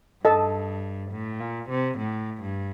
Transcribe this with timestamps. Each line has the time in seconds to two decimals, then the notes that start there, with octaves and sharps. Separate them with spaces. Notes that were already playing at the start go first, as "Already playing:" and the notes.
0.25 G2 A4 D#5 A5
1.12 A2
1.40 A#2
1.70 C3
1.98 A2
2.42 G2